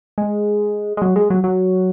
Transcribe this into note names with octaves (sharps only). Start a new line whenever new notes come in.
G#3
G#3
F#3
G#3
F#3
F#3